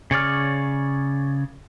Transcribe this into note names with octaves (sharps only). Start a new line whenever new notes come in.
C#3 C#5 D5 F6